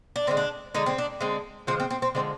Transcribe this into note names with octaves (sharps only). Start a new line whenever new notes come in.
D4
D3 F3 G#3 C4
D4
D3 G#3 D#4
C4
D4
D3 G#3 C4
D3 F3 G#3 C4
C4
C4
C4
D3 F3 G#3 C4